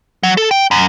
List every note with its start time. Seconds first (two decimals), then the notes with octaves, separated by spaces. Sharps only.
0.23 F#3
0.37 A4
0.51 G5
0.71 F#2